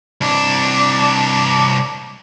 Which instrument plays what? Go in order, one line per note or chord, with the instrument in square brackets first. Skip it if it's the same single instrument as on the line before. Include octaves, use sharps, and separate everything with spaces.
[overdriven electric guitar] C2 D4